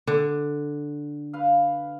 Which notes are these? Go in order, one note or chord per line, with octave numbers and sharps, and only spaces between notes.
D3
B4 F5